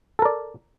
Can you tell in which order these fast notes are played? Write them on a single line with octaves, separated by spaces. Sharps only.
A4 A#4 D5